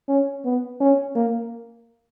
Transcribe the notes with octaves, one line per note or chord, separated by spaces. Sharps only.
C#4
B3
C#4
A#3